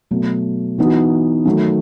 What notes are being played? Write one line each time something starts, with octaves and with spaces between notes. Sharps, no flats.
B2 F#3 A3
E3 B3 D#4 F#4
D#3 F#3 A3